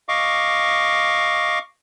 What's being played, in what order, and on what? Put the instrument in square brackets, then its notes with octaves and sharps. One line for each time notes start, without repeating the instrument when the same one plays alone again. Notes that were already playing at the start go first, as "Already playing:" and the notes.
[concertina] D#5 F5 C#6 D6